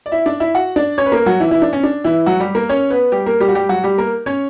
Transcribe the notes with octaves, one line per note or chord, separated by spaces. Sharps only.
D5
E4 E5
D4 D5
E4 E5
F#4 F#5
D4 D5
C#4 C#5
B4
A#3 A#4
F#3 F#4
E3 E4
E3 E4
D4
C#4
D4
E3 E4
F#3 F#4
G3 G4
A#3 A#4
C#4 C#5
B3 B4
G3 G4
A#3 A#4
G3 G4
F#4
G3 G4
F#3 F#4
G3 G4
A#3 A#4
C#4 C#5